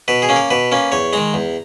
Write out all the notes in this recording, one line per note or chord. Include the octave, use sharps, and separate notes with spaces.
B2 B4
G#4
A#3 C#4
A#4
B2 B4
A#3 C#4
E2 C#5
D#3 G#3 A#5
E2